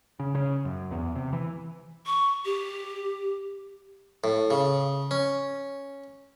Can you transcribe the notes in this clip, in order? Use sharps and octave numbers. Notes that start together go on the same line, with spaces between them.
C#3
C#3
F#2
E2
C3
E3
C#6
G4
A2
C#3
C#4